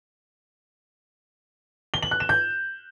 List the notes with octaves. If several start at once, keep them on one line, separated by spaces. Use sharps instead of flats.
G7
F#7
F#6
E7
G6